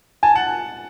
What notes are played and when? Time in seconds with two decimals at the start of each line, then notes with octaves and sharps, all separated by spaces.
0.23 G#5 A5
0.35 F#5 A5